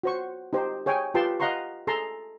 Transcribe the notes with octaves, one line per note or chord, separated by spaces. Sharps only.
F#4 C5 C#6
D#4 G4 C5
G#4 C#5 G5 G#5
F4 G4 B4 G5 A5 C6
D#5 F5 F#5 A#5 C6 C#6
G#4 A4 A5 A#5 C6